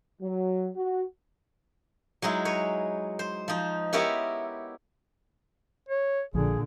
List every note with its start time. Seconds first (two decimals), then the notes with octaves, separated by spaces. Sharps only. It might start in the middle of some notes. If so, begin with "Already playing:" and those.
0.22 F#3
0.76 F#4
2.22 F#3 G#3 D#4 E4
2.45 B4 C#5
3.19 C5
3.48 F3 D#4
3.93 B3 E4 G4 A#4 C#5 E5
5.89 C#5
6.34 A#1 A#2 D3 F3 G#4